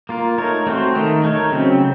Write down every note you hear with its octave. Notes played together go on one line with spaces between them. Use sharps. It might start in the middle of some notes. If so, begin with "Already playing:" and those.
A#3 F4 A#4
A3 D#4 A#4 C#5
A3 C4 F#4 C5
D#3 A3 D#4 A#4
A3 D#4 A#4 C#5
C#3 F#3 C4